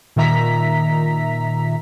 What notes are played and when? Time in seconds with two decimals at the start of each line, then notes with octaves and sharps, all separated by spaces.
0.16 A#2 D#3 E5 A#5 B6